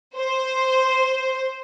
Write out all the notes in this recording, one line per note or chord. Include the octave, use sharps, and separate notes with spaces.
C5